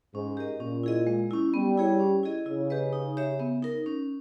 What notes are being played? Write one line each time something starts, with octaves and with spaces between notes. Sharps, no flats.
G#2 C#4
G4 A#4 D#5
A#2 C#4
E4 G#4 D#5
G#3
C#4 E4
G3 B3
E4 G#4 C#5
C#4
E4 G#4 D#5
C#3 E4
G4 B4 D#5
D#4
G4 C#5 E5
B3
D#4 A#4
C#4